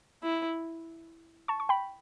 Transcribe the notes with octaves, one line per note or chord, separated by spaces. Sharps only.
E4
A5 C#6
C#6
G5 B5